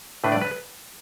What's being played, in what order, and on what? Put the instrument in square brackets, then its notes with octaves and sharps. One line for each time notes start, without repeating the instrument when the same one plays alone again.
[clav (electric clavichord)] A2 A3 D4 B4
D5
B4